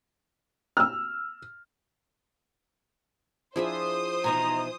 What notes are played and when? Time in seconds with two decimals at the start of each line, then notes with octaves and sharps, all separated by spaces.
0.77 E6 F6
3.56 F3 D4 E4 G#4 C5 E5 D#6
4.24 B2 E3 D#4 G#5 A#5